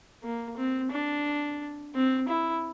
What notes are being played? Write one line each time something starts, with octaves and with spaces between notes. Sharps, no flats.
A#3
C4
D4
C4
E4